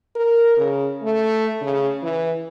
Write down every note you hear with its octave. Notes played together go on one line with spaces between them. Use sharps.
A#4
C#3
A3
C#3
E3